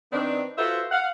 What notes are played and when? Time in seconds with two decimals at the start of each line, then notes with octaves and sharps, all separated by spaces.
0.12 D#3 B3 C4 D4
0.58 F4 F#4 A4 B4 C5 E5
0.91 F5 F#5